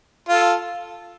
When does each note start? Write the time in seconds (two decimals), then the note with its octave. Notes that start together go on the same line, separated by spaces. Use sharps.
0.29 F4 A4